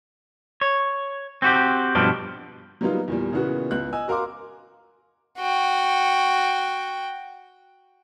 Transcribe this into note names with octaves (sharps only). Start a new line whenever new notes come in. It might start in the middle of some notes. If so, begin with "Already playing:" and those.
C#5
C4 F#4 G4
G2 B2 F3 D4
F#3 G3 A#3 B3 D#4 F4
E2 A#2 G3
A#2 C#3 E3 B3 F#4
C#2 B3 F#6
D#5 G#5 E6
F#4 A#4 F5 C6 D6
F#4 G5